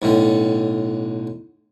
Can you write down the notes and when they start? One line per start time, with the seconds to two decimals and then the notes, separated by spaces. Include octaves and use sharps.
0.02 B1 A2 D3